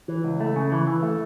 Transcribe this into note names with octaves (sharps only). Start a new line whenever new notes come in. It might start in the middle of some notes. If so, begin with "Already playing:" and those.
E3
C#2
A3
C#3
E3
E3
A3